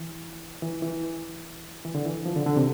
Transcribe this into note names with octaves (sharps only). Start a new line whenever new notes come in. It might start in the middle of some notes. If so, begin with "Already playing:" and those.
Already playing: E3
E3
E3
E3
D3
E3
F3
D3
D3
C3